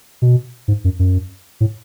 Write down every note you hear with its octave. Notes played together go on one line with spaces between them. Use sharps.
B2
G#2
F#2
F#2
A2